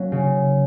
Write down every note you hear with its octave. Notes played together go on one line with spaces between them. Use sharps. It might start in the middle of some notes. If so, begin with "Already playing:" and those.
Already playing: F#3 A#3 C#4
C#3